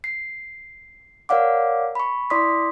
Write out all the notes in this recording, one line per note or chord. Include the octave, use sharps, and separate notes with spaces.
C7
A#4 C#5 D5 F5 F#5 D6
B5 C#6
E4 D5 C6 D6 D#6 B6